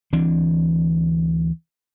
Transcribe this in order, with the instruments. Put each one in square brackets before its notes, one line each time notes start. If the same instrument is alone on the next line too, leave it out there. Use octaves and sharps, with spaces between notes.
[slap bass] D2 E3 C4 D4